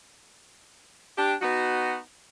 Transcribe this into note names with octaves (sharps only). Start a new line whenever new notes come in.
D4 G4
B3 D#4 F#4